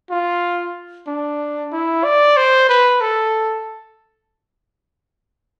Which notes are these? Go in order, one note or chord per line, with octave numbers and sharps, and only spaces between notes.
F4
D4
E4
D5
C5
B4
A4